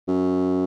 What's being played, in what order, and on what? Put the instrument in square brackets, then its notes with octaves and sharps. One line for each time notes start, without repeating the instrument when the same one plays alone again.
[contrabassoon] F#2